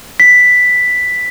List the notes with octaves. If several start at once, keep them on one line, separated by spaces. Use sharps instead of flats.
B6